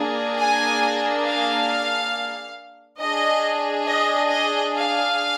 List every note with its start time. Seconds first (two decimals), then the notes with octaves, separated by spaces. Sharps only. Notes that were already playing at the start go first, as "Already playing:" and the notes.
Already playing: A#3 D4 G#4
0.38 G#5
1.25 F5
3.00 D4 G#4 D#5
3.87 D#5
4.31 D#5
4.74 F5